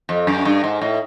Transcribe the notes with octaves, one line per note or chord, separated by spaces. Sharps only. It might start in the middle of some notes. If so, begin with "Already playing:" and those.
F2
F#2
G2
G#2
A2